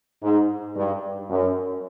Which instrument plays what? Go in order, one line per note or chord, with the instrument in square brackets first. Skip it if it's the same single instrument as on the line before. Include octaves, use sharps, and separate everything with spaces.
[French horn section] G#2
G2
F#2